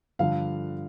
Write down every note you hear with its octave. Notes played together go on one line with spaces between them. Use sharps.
G2 D3 F3 F5